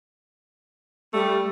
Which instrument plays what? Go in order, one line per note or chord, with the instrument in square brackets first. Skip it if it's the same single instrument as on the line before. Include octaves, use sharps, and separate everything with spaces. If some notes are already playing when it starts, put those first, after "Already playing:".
[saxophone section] G3 [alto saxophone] A3